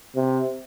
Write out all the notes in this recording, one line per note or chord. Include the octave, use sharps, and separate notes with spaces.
C3